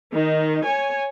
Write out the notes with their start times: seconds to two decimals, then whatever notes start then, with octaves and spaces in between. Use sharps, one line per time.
0.13 D#3 D#4
0.65 C#5 G#5